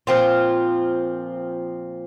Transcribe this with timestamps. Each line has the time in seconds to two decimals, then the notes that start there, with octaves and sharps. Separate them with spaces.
0.07 A#2 F3 C4 F4